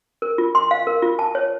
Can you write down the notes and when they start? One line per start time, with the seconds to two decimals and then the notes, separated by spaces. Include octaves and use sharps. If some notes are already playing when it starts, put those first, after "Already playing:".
0.22 A#4
0.38 F4
0.55 C6
0.71 F5
0.87 A#4
1.03 F4
1.19 A5
1.35 C#5